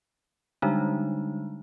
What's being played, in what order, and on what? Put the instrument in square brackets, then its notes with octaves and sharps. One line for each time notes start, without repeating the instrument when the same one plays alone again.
[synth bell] D3 G3 G#3 D4 D#4